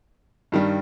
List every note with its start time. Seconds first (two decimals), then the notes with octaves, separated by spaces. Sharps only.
0.52 G2 D#3 G3